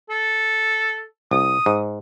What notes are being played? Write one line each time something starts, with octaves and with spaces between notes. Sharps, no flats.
A4
C2 D#6
G#2